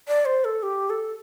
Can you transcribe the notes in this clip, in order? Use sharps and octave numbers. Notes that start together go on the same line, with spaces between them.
D5
C5
A4
G4
A4